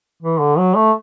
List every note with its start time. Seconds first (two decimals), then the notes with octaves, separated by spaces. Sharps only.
0.22 E3
0.40 D3
0.58 F#3
0.76 A3